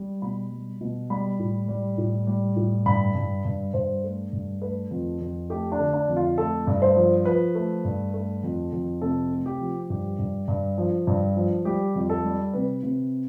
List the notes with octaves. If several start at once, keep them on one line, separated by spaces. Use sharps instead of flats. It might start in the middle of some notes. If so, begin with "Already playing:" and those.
Already playing: G3
B2 B5
G3
B2
G3 B5
A2
G3
A2
G3
A2
G2 B5
G2
G2
G2 C5
A3
G2
A3 B4
F2
F2
A3 G4
D4
D3
D4
F2
F4
A3 A4
G2
C5
F3
F3 B4
A3
G2
A3
F2
F2
C3 A4
A3
G4
F3
G2 G4
G2
G2
F3
G2
F3
G3 G4
F2
A4
G3
C3 B4
C3